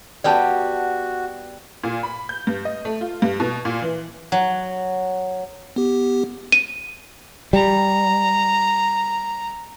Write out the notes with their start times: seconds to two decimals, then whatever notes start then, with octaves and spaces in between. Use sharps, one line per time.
0.24 G3 B3 F#4 G4 D5 A5
1.84 A#2
2.03 B5
2.29 G6
2.47 G2
2.65 D#5
2.85 A3
3.01 F4
3.22 G2
3.40 B2
3.65 A#2
3.82 E3
4.32 F#3
5.76 B3 G4
6.52 D#7
7.53 G3 A#5